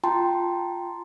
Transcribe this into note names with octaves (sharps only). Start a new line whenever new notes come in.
F4 G5 A5 A#5 C6